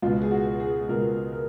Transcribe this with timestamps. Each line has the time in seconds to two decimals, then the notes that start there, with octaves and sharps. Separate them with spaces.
0.02 C#2 B2 F4
0.22 G#4
0.31 F#4
0.60 G#4
0.89 C#2 B2 A#4
1.32 A#4